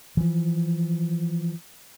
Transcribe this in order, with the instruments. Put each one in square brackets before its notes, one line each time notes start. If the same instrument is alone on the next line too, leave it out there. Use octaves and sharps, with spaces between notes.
[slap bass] E3 F3